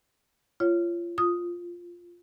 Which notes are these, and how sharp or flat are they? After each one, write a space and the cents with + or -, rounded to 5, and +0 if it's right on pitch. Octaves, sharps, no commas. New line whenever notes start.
F4 -25 C#5 +0
F4 +0 D#6 +0